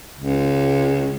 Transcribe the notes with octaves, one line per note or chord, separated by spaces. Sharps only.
C#2